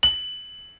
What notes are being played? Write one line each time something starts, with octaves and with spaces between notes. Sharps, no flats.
F#7